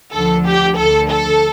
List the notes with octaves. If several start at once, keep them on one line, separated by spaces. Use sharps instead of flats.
D2 D3 F3 A4
G4
D2 D3 F3 A4
A4